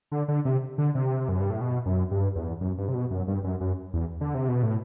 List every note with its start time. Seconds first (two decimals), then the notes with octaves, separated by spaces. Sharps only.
0.12 D3
0.28 D3
0.45 C3
0.78 D3
0.95 C3
1.29 F#2
1.40 G2
1.50 A2
1.61 B2
1.86 F#2
2.11 G2
2.36 E2
2.61 F#2
2.78 G2
2.89 C3
2.94 B2
3.11 F#2
3.28 G2
3.44 F#2
3.61 F#2
3.94 E2
4.21 D3
4.34 C3
4.48 B2
4.63 A2